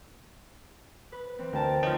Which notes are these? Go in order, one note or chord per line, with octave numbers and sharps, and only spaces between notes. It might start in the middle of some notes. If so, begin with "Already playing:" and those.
B4
E3 C4
D2 A#4 G5 A5
F3 D#4 C#5 A#5